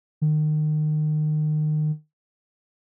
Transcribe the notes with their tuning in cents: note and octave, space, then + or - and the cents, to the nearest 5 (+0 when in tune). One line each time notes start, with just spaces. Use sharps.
D#3 -30